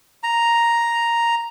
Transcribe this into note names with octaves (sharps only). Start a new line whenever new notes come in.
A#5